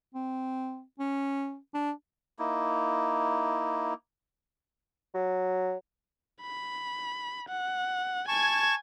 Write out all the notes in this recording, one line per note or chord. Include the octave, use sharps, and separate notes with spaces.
C4
C#4
D4
A#3 D#4 E4
F#3
B5
F#5
G#5 A5 C#6 G#6